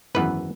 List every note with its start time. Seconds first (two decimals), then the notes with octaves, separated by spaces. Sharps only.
0.15 G#1 F#2 E3 B3 B4